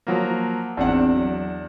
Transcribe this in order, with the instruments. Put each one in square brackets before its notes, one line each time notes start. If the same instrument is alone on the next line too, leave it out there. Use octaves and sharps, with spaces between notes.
[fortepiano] F3 F#3 A#3
[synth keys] G#1 C4 [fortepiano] E2 D4 F#5
[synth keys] F#3